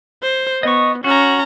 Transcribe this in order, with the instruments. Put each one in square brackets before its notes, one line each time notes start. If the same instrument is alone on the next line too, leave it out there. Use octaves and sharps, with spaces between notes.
[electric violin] C5
[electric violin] B3 [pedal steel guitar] D#5 C#6
[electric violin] C#4 A#5 [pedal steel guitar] F#4